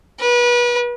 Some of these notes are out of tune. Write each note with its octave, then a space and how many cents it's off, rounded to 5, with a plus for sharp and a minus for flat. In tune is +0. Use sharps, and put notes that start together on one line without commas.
B4 -30